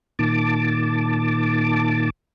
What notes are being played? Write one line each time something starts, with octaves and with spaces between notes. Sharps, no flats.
A#2 D#3 A5 D6